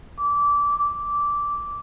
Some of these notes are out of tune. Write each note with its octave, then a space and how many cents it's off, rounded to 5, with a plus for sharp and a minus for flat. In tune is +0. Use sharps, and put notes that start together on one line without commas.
D6 -20
D6 -10